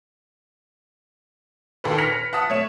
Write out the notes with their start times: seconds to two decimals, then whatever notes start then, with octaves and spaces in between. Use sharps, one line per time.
1.84 D#2 A#2 A4 B4
1.98 F6 A#6 B6 C#7 F7
2.12 B4
2.33 F#5 A5 D#6 B6
2.50 A3 C#5 E7